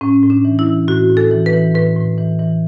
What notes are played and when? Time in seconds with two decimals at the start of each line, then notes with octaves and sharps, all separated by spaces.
0.01 A2 C#4
0.23 A2
0.30 D4
0.45 E3
0.59 E4
0.66 E3
0.88 A2 F#4
1.10 A2
1.17 A4
1.31 E3
1.46 B4
1.53 E3
1.75 A2 B4
1.96 A2
2.18 E3
2.39 E3